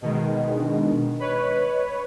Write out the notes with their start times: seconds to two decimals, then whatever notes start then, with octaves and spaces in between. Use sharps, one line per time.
0.02 B2 D#3 G#3 D#5
0.54 D4
1.20 B4 C#5 D#5